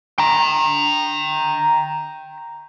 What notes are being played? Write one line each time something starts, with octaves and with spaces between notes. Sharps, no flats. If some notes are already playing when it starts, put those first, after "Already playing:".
G5 A#5